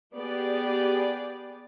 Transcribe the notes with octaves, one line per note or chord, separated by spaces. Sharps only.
B3 G4 G#4 D5